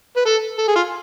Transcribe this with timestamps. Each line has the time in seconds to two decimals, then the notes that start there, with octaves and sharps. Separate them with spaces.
0.17 B4
0.25 A4
0.58 A4
0.68 G#4
0.76 F4